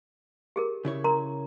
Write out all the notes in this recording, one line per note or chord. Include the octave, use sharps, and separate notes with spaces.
G4 G#4 A#4
C#3 E4 C#5
A#4 A#5 C6